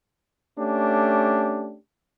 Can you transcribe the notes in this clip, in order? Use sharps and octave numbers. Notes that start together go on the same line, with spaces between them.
A3 C#4 D4 G4